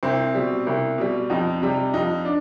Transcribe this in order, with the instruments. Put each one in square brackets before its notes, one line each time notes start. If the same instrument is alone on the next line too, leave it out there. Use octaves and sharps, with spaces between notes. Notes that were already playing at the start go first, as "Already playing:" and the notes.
[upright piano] C2 C4
B2 G3
C2
B2 G3
F2 D#4
C3 G3
F2 D#4
D4